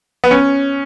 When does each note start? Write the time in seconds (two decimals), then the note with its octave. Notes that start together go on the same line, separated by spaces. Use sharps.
0.24 B3
0.31 C#4